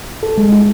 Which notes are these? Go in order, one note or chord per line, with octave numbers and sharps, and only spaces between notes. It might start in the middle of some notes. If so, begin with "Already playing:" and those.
A4
G#3
E4